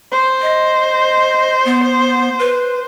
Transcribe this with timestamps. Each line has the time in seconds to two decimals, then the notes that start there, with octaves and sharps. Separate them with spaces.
0.12 C5
0.42 D#5
1.65 B3
2.39 B4